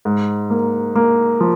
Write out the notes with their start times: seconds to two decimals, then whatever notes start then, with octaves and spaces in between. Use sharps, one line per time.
0.05 G#2
0.50 A#3
0.95 A#3
1.41 F3